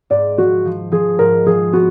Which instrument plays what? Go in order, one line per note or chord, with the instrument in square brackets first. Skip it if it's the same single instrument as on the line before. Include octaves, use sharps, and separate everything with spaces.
[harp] G#2 [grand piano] D5
[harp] F3 [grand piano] F#4
[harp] F3
[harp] F3 [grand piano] G#4
[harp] G#2 [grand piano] A#4
[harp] F3 [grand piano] G#4
[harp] B3 [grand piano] F#4